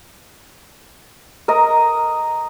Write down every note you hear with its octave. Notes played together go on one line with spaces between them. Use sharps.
A#4 D#5 A#5